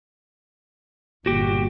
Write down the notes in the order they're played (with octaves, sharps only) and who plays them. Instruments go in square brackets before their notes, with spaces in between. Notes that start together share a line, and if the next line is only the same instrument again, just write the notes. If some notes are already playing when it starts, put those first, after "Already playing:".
[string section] G1 A#2 [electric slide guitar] F#4 G4